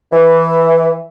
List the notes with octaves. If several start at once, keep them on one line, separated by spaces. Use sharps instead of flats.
E3